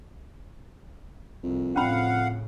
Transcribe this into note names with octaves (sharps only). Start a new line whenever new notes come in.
C2 F2
A2 C#3 C#4 F5 F#5 B5